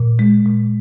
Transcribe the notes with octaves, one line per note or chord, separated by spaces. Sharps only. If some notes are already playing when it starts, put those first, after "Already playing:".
Already playing: A#2
G#3
A#2